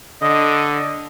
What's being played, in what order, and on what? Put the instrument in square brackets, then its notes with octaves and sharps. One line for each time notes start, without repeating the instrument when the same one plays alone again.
[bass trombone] D3 [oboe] D#5